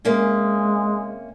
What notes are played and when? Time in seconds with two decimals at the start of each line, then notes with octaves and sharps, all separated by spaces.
0.05 C3 G#3 A#3 C#4